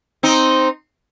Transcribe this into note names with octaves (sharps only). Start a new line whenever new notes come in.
C4 D#4